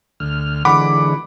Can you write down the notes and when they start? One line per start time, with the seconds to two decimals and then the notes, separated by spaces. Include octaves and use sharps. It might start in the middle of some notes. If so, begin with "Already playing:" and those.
0.20 D2 F6
0.65 D3 E3 G#3 F#5 B5 D6